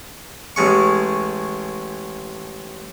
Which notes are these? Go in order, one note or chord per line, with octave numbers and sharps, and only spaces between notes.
A1 G#3 C#6